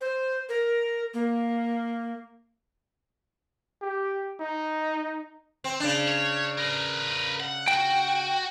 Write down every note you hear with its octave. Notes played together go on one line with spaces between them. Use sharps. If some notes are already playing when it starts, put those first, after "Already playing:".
C5
A#4
A#3
G4
D#4
C4
C#3 D4
C#5
A#4 B4
F#5
F#4 G5